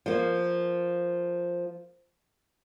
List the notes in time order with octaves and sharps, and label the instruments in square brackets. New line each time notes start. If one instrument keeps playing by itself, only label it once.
[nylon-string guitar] F3 A#3